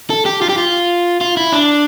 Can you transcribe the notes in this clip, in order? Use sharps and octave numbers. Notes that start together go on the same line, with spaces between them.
A4
G4
F4
G4
F4
F4
E4
D4